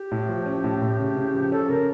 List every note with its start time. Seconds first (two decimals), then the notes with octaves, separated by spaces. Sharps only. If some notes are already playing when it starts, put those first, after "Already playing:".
Already playing: G4
0.12 A2
0.29 F3
0.46 C#4
0.64 A2
0.82 A2
0.99 C#3
1.17 C#3
1.34 F3
1.52 C#4 A4
1.69 C#3 A#4